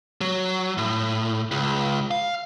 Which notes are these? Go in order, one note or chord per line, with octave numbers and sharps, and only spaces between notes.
F#3
A2
C#2
F5